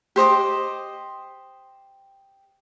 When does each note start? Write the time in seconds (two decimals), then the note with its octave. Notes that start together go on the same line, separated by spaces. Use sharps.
0.16 G4 C5 D#5 D6